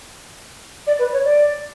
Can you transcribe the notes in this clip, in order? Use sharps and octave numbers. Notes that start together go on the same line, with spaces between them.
D5
B4
C#5
D5